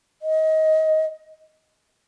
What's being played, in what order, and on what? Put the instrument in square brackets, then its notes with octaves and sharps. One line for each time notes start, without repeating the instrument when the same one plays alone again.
[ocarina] D#5